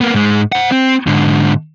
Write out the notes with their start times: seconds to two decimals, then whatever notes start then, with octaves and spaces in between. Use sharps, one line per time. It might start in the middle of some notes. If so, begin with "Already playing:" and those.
0.01 A#3 B3
0.15 G#2 G#3
0.52 C5 F#5
0.72 C4
1.07 G#2 D3